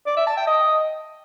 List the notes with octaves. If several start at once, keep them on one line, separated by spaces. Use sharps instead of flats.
D5
E5
A5
G5
D#5